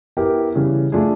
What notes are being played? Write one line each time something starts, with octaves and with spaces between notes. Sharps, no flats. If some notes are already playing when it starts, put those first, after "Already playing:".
B3 E4 G4 A#4
C#3 E3 G3
A3 D4 F4 G#4